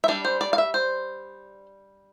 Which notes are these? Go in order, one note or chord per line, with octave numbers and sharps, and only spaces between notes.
E5
G3 D4 D5
C5
D5
F5
E5
C5